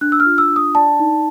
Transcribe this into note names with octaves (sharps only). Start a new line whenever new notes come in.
D4 F#6
E6
F6
F4
E6
D4
D#6
D5 A5
D#4